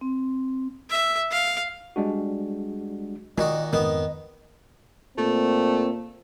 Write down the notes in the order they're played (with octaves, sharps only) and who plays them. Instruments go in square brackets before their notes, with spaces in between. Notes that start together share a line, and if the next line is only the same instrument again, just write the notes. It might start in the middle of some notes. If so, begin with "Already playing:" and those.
[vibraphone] C4
[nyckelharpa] E5
F5
[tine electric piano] G3 G#3 D4 F#4
[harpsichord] A#2 D#3 F#4 [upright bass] F4 [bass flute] D#5
[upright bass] F2 G#2 [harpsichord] D#3 B3 [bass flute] D#5
[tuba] A#2 [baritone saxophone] A3 [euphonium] C4